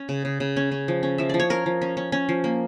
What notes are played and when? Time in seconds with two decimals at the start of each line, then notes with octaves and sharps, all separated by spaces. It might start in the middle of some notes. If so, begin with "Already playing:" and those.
Already playing: C#4
0.09 C#3
0.25 C#3
0.40 C#3
0.56 C#4
0.72 C#4
0.88 F3
1.03 C#4
1.18 F3 E5
1.29 F3 D5
1.40 C#5
1.50 C#4 A#4
1.66 F3
1.82 C#4
1.97 C#4
2.12 C#4
2.29 F3
2.44 A#3